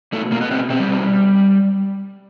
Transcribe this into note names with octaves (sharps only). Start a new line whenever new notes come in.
B2 A3
B2 A#3
B3
B2 C4
B2 C4
G3
B2